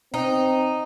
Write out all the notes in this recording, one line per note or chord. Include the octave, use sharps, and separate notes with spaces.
C4 D#4